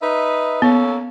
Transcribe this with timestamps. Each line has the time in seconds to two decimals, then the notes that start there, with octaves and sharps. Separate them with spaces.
0.01 D#4 B4 E5
0.62 A#3 B3 C#4 A4